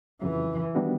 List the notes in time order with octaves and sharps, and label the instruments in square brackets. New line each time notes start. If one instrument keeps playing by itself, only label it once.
[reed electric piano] F2 C#3 F#3 [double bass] E3
[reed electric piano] D#3 G3 B3 D4 F#4